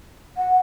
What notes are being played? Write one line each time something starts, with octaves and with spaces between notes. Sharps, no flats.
F#5